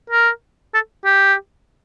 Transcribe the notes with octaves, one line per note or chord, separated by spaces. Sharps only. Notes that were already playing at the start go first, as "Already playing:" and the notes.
A#4
A4
G4